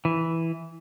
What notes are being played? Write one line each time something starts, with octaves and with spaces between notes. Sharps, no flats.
E3